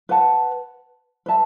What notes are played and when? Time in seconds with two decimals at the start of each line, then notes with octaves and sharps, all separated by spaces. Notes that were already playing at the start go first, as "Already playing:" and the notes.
0.09 B4 F#5 A5
1.26 B4 E5 A5